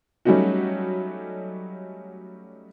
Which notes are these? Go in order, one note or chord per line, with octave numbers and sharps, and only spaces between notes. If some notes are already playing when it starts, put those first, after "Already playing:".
F#3 G3 A3 C#4 D#4 F#4